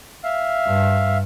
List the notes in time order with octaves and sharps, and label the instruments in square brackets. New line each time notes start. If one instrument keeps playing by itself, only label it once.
[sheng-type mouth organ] E5 F5
[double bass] G2